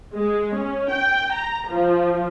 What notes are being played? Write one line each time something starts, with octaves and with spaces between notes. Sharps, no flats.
G#3
C#4
G5
A#5
F3